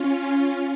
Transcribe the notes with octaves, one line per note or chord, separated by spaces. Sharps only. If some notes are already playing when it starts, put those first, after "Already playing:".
Already playing: C#4 F4